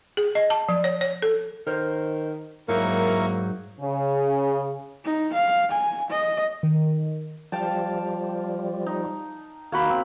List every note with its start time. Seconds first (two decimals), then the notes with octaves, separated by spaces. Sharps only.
0.17 G#4
0.35 D#5
0.50 A5
0.69 F3
0.84 C#5
1.01 C#5
1.22 A4
1.67 D#3 A#4 C5
2.68 G#2 F#3 A#3 D#4 E4 A#4 C#6
3.81 C#3
5.05 D#4
5.33 F5
5.72 G#5
6.10 D#5
6.63 D#3
7.52 F3 G3 F5 G5 A5
8.86 D#4
9.72 D#3 A#3 F#4 B5
9.90 C4